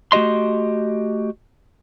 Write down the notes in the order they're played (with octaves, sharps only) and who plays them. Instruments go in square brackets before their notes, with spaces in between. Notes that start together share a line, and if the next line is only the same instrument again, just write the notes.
[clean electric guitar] A3 F#4 G4 D#5 C6